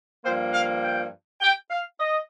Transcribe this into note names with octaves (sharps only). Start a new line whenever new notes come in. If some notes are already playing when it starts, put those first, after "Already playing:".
G2 F3 A#3 C5
F5
G5
G5
F5
D#5